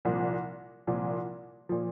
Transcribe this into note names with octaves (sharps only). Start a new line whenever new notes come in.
C2 A#2 F3
C2 A#2 F3
A#2 F3